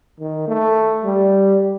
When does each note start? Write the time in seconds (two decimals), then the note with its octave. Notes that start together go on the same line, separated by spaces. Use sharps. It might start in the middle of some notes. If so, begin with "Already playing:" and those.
0.20 D#3
0.48 A3
1.04 G3